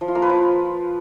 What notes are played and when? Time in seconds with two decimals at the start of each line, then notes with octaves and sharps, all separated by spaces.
0.01 F3
0.08 F4
0.15 A#3
0.22 B4
0.29 F3